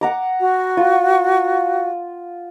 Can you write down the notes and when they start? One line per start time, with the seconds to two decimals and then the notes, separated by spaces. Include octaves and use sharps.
0.01 F#5 A#5 D6
0.40 F#4
0.77 F4